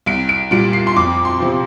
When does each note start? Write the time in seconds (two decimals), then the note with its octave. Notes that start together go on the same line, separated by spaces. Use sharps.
0.06 C2 D7
0.29 D7
0.51 A#2 G3 D7
0.73 C7
0.87 C6
0.96 F2 D6
1.25 C6
1.40 C3 F3